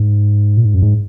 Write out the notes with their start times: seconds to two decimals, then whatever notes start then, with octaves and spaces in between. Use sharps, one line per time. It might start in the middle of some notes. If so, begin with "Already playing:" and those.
Already playing: G#2
0.57 A#2
0.65 G#2
0.74 F#2
0.82 G#2